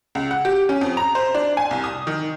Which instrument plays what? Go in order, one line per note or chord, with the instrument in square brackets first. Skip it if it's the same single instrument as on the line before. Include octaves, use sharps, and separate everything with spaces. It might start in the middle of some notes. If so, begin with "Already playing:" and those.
[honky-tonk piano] C#2
F#5
G4
C#4
F2
A#5
C5
D4
G#5
C2
D#6
D#3